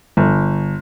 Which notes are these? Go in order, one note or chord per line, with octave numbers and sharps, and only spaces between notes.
G1